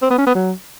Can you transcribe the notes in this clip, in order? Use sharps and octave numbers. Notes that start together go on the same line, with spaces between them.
C4
B3
C#4
B3
F#3